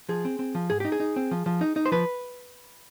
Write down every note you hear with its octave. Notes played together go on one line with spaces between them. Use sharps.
F3 G#4
C4
C4
F3
G#2 G#4
D#4 G4
G#4
D#4
C4
F3
F3
D#4
D#4
C5
F3 B4